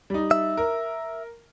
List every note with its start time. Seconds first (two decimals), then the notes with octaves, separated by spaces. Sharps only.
0.10 G3 D#4
0.31 E5
0.57 A#4